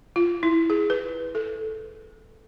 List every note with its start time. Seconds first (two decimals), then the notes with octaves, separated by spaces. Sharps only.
0.16 F4
0.43 E4
0.70 G#4
0.90 B4
1.35 A4